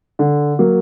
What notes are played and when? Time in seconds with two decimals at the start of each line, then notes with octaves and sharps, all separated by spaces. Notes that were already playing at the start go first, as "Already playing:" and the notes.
0.19 D3
0.59 F#3 A#3